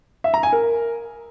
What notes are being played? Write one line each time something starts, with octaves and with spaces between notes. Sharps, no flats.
E5
A#5
G#5
A#4